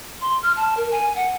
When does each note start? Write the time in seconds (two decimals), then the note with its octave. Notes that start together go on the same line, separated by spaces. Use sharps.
0.21 C6
0.43 F6
0.57 A5
0.77 A#4
0.91 G#5
1.16 F#5